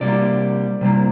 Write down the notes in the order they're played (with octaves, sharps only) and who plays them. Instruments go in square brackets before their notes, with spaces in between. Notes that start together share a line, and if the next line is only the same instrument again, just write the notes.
[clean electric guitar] C3 G3 A#3 D5
C3 G3 A#3